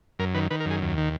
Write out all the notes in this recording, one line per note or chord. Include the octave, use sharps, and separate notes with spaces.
F#2 A#4
D#3 B4
D#3 B4
A#4
F#2 G#4
D#2
D#3